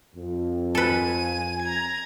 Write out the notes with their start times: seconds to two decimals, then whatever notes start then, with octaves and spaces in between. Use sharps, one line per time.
0.14 F2
0.75 A4 B4 G#5 D#7
1.62 A#5 G#6